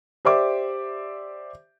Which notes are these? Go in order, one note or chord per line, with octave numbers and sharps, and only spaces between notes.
G4 C5 D5 E5 D6